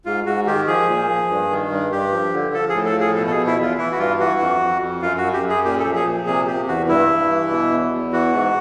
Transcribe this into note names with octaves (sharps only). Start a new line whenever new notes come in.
G#2 F4
G#2 F#4
D#3 G4
F3 G#4
A#2
F3
G2
D#3
G2
G2 G4
F3
D3
F3 A4
A2 G#4
A4
F3 G#4
B2 A4
A4
B2 G#4
E4
E2 F4
E3 E4
F#4
G2 F4
E3 F#4
F2
F2
F2
F#2 F4
F#4
F#2
G4
F#2
G#4
A#2 G4
A4
F3
G#4
A#2
C3 G#4
C3 G4
E2 F#4
G2 E4
G2
E3
B2
E2
E2
E3 F#4
G#2